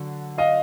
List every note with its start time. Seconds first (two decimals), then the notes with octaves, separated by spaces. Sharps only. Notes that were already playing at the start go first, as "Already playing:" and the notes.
Already playing: D3 F#3
0.38 D#5 F5